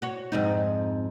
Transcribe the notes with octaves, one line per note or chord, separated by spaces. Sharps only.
F#4 C#5
F2 G#2 D#4